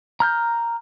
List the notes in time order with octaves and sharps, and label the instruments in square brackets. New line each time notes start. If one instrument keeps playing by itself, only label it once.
[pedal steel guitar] A#5 F6 G6